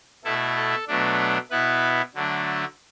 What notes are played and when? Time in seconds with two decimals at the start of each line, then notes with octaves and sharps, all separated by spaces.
0.24 B2 A3 E4 A4
0.56 A4
0.87 B2 F#3 A3 D4
1.50 B2 B3 E4 B4
2.15 D3 F#3 A3 D4